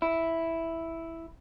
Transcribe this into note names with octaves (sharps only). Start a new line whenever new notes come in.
E4